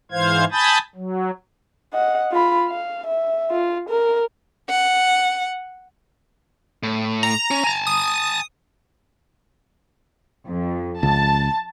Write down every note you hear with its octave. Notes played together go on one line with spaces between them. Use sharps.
G#2 E3 C5 F5 G#6
G#5 A5 B5 D#6 G6 A6
F#3
D#5 F#5
F4 B5
F5
E5
F4
A#4
F#5
A2
A#5
C#4
G#5 A5
D#6
F2
C#2 A5